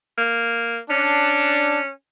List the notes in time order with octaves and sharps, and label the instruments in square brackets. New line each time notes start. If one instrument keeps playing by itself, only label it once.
[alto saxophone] A#3
[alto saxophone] C#4 [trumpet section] D4